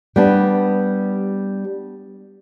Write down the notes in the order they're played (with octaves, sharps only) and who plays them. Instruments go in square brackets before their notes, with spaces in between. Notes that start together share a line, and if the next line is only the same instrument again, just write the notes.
[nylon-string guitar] G3 B3 D4